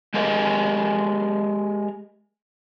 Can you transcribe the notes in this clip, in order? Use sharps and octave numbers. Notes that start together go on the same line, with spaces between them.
G#3 G4 G#4 A#4 D#5 E5